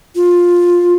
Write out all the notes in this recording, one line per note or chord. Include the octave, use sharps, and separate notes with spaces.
F4